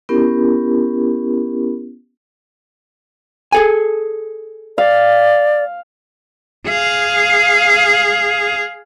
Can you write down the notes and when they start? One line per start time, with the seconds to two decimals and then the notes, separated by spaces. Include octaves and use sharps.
0.09 B3 C#4 E4 G4 A#4
3.52 G#4 A4 G#5
4.78 D5 F5
6.67 G#4 F5